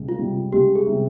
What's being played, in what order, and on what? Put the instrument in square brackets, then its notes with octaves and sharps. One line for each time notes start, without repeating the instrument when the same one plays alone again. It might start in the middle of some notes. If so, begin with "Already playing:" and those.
Already playing: [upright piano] C#2 C3 G3
[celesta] F4
[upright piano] C3 G3
[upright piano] C#2 [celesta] G4
[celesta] G#4
[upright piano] C3 G3